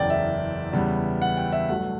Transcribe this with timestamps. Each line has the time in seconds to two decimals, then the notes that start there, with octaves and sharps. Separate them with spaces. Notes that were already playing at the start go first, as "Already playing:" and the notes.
Already playing: F#1 E2 C#3 D5 G5
0.10 E5
0.73 E2 C#3 G3 B3
1.22 F#5
1.37 G5
1.53 E5
1.69 A1 G2 F#3 A3 F#5